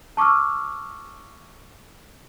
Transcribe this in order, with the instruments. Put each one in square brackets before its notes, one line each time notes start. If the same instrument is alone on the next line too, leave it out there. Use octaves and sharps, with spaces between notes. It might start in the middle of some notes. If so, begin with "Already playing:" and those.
[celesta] A5 C#6 D6 E6 F6